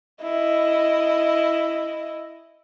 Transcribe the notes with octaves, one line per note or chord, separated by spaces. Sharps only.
E4 D#5